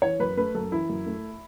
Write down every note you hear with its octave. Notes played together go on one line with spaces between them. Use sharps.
E3 C#5
F#2 B4
A3 B4
F#2 A4
E3 E4
F#2
A3